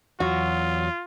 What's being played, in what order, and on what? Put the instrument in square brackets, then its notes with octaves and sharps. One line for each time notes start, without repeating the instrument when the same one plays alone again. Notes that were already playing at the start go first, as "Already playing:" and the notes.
[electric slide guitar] E2 F#3 [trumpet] F4 [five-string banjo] F#4